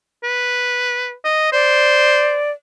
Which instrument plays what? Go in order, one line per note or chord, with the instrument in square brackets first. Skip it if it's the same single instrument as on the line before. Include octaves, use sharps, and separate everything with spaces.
[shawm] B4
D#5
[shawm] C5 [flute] D5